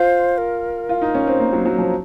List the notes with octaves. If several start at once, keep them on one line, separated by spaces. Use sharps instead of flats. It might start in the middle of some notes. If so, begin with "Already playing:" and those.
Already playing: F4 C5
A#4
F4
D#4
C#4
C4
A#3
F#3
F#3
F3